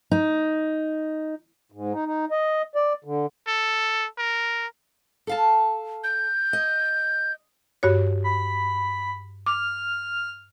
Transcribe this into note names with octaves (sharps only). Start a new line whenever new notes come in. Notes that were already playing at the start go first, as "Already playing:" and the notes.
D#4
G#2
D#4
D#4
D#5
D5
D3
A4
A#4
A4 F5 A5
G6
D#5
G2 F#4 C#5
B5
D6 F6